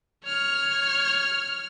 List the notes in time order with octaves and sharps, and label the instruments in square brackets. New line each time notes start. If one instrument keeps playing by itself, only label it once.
[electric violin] C#5 F6